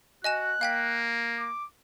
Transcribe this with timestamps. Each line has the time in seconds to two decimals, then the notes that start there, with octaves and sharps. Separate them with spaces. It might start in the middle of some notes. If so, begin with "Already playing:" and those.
0.24 F#4 D#5 G#5 F#6 E7
0.61 A#3 F5 G5 B6
1.39 D6